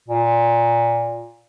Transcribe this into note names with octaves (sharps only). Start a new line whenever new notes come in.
A#2